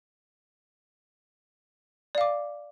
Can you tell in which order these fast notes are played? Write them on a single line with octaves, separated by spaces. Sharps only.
D5 F5 D6